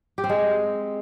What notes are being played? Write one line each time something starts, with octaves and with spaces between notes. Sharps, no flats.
G4
C4
G#3